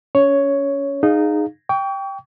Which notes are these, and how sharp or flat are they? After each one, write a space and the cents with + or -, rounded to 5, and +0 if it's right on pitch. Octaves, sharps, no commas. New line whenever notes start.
C#4 +25 C#5 +5
D#4 -15 G#4 +0 F5 +5
G5 +0 C#6 +40